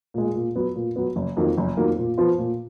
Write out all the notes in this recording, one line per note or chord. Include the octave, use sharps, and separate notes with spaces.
A#2 G#3
A#2
F#3 B3
A#2
F#3 B3
F#1
F2 D#3 F#3 A#3
F#1
F2 D#3 F#3 A#3
A#2
F3 B3 F4
A#2